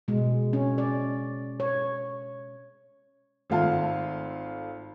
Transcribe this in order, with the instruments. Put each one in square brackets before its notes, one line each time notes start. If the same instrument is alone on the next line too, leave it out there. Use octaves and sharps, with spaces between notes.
[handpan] B2 G#3
C#4
D5
C#5
[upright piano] G#1 A3 F4 A5